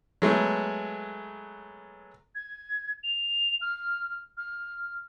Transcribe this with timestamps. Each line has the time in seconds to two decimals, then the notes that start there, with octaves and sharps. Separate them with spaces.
0.22 F#3 G#3 A3 B3
2.35 G#6
3.03 F7
3.61 F6
4.37 F6